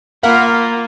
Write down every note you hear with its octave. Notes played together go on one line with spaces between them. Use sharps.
A#3 F4 A#4 F5 F#5 B5